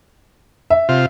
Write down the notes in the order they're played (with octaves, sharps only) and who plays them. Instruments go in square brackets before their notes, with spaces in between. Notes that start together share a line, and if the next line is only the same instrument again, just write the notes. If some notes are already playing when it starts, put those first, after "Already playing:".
[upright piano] E5
[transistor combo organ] C3 F4